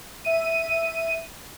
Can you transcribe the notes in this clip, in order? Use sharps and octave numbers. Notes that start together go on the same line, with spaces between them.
E5 D#7